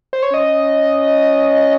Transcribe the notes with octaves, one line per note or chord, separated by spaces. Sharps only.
C5
C#5
C#4 D#5